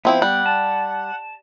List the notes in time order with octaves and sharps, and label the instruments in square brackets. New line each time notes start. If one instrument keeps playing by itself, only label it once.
[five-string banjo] F3 C4 E4 [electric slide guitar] B3 G5
[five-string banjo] G3 [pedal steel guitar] F#5
[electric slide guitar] A5